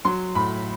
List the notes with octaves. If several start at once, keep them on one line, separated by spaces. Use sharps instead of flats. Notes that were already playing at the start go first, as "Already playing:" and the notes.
F#3 C6
A2 B5